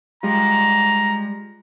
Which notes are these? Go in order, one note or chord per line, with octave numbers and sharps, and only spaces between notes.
G3 G#3 F4 A#5